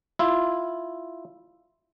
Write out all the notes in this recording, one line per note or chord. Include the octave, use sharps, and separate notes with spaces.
E4 F4